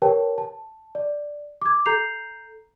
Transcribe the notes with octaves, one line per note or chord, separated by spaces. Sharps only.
G4 A#4 B4 C#5 G5 A5
A5
D5
D6 G#6
A4 A#5 G6 C7 F7